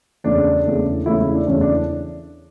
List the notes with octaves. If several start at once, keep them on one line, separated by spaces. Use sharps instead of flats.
E2 C#3 E3 A3 D4
E2 C#3 E3 A3
E2 C#3 E3 A3 E4
D4
E2 C#3 E3 A3 C#4
D4